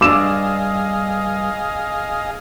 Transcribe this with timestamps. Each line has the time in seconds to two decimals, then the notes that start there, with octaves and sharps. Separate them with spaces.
0.01 G2 D4 G#4 D#5 F5 D6 E6 E7